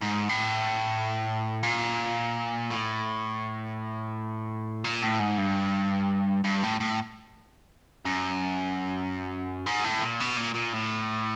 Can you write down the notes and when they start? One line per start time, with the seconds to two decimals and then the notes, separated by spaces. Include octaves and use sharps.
0.02 G#2
0.29 A2
1.63 A#2
2.70 A2
4.84 A#2
5.02 A2
5.20 G#2
5.38 G2
6.44 G2
6.64 A2
6.80 A2
8.05 F#2
9.66 G#2
9.84 A2
10.02 A#2
10.20 B2
10.37 A#2
10.55 A#2
10.74 A2